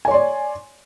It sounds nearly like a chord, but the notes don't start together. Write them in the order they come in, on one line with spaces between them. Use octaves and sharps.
G#5 C#5 C6 D5